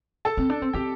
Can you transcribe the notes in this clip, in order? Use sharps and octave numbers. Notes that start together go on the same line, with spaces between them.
A4 A5
C4
D4
C4
C4 G4 G5